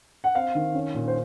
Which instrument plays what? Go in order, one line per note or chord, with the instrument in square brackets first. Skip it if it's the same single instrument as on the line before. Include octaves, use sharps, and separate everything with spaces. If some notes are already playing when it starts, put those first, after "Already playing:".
[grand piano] F#5
C4 F5
D#3
C#4
A#2
C5